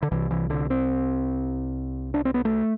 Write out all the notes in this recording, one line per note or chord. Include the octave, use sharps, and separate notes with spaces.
D3
C2 C3 E3
E3
D3
C4
D4
C4
B3
A3